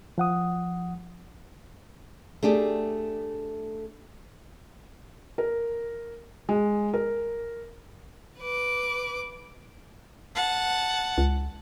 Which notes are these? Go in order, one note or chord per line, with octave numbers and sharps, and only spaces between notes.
F3 F#5 D#6
A3 D4 G4 G#4
A#4
G#3
A#4
B4 D6
F#5 A5
C#2